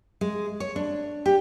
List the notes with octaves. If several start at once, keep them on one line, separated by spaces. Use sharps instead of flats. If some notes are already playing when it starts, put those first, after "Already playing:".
G#3
C#5
D4
G4